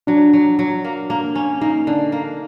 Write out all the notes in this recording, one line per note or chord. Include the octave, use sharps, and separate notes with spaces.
F#3 D4
F#3
F#3
A#3
A#3
C#4
A#3 D#4
D3
A#3